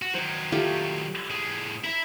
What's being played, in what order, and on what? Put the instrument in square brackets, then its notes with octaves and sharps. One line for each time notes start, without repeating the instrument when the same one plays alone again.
[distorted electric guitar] F#4
[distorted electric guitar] D#3 F#3 [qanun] C5
[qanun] A3 F4 G4
[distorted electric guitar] A2 G#4
[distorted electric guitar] E4 E5 [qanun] A#5